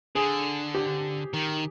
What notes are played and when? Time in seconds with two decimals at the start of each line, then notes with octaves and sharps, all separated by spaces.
0.15 D3 G#4
0.75 G4
1.34 D#3